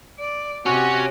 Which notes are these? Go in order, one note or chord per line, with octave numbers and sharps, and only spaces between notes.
D5
C3 C#4 F#4 G4